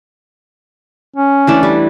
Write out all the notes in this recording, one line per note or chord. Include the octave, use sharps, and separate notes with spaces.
C#4
E3 A3 D4
G3